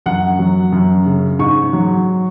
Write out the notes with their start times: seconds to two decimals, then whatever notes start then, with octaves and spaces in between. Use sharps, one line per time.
0.06 F#2 F#5
0.39 F#3
0.72 F#2
1.06 C#3
1.39 G#2 C#6
1.73 F#3